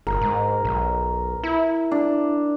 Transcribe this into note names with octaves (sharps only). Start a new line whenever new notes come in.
G1 A#4
G#2
B1
E4
D4